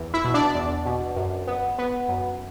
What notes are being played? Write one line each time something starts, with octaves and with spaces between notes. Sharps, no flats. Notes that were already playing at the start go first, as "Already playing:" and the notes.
Already playing: E2
E4 E5
B2
D4 D5
E2
B2
F#2
B3
B3
F#2